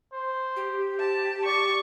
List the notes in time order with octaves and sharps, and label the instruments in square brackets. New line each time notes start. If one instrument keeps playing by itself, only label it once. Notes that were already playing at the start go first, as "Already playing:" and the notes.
[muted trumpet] C5
[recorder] G4
[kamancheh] A5
[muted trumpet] D5 [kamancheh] C#6